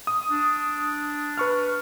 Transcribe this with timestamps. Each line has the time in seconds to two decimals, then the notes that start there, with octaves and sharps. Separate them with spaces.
0.07 D#6
0.30 D4
1.38 B4 C#6 F6